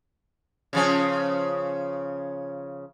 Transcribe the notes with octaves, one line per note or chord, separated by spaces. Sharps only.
C#3 F3 C#4